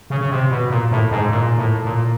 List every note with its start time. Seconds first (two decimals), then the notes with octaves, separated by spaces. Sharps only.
0.10 C#3
0.21 C#3
0.31 C3
0.51 B2
0.70 A#2
0.91 A2
1.11 G#2
1.31 A#2
1.58 A2
1.85 A#2